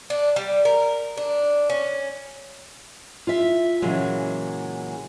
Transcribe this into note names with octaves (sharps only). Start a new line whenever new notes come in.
D4
G3
A#4
D4
C#4
F4 E5
A#2 C#3 E3 F#3 G#3